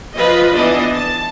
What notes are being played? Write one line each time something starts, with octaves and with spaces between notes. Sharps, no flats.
F3 F4 B4 D#5
E3 B3 D4 D#5
A5